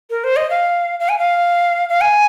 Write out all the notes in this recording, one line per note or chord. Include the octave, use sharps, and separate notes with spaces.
A#4
C5
D#5
F5
F5
G#5
F5
F5
G#5